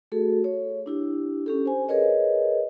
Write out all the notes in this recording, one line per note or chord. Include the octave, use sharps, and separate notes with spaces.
A3 F#4 G#4 A4
C#5
D4 E4 G4
C#4 G4 A4
C5 G#5
G#4 A#4 B4 C#5 D#5